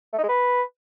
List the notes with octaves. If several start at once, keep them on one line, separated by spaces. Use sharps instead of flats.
A3
D#4
G#3
B4